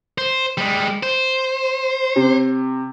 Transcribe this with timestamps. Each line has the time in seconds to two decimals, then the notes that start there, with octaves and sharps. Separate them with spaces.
0.18 C5
0.58 G3 G#3
1.03 C5
2.16 C3